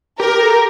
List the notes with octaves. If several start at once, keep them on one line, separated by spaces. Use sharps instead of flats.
G4 A#4
A4
G4